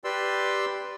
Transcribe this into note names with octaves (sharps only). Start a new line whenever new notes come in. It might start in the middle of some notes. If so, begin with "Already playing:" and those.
G4 B4 D5 C6 E6